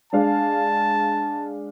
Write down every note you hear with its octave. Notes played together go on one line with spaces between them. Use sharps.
G#3 D4 F5 A5